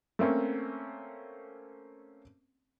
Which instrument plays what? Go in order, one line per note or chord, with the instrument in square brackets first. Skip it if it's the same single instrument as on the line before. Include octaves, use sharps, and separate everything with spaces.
[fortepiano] A3 A#3 C4 C#4